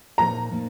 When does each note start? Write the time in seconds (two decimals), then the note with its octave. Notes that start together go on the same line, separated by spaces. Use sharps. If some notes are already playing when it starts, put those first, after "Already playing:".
0.18 A#2 F3 A#3 D#4 A#5
0.52 A#2 F3 A#3 D#4